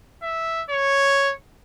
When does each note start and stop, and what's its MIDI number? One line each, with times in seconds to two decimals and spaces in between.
0.23 0.63 76
0.70 1.33 73